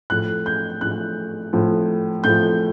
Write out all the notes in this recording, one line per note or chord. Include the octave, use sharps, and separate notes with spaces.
A2 F3 F#6
G6
A2 F3 F#6
A2 F3
A2 F3 G6